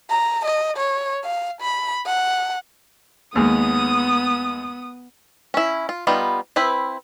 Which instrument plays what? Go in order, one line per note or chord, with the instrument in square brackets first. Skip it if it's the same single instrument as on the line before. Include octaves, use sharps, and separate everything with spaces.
[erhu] A#5
D#5
C#5
F5
B5
F#5
[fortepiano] D#2 G#3 [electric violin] B3 [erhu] D#6
[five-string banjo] C#4 E4
F4
G3 B3 D#4 F4
C4 E4 B4